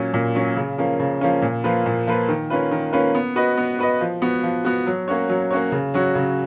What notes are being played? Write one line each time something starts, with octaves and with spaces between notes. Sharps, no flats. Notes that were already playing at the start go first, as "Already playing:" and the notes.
Already playing: A#2 F#3 C#4
A#2
F#3 C#4
C#3
F3 A#3 C#4
C#3
F3 A#3 C#4
A#2
F3 A#3 F4 B4
A#2
F3 A#3 F4 B4
D#3
A#3 C#4 F4 B4
D#3
A#3 C#4 F4 B4
B3
F#4 B4 D#5
B3
F#4 B4 D#5
F3
B3 F#4
F3
B3 F#4
F#3
A#3 C#4 F#4 C#5
F#3
A#3 C#4 F#4 C#5
C#3
F#3 C#4 F#4
C#3